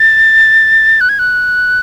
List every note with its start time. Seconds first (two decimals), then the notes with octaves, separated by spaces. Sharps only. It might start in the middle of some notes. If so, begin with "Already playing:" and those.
Already playing: A6
1.01 F#6
1.09 G#6
1.19 F#6